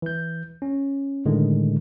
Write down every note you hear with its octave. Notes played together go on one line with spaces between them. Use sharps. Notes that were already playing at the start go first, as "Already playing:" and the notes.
E3 G6
C#4
A2 D3 D#3 G#3